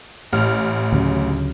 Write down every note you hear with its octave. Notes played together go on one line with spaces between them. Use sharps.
A1 F6
D2 C#3 F#3